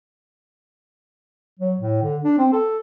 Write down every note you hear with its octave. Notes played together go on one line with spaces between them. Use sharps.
F#3
A2
D3
D4
C4
A4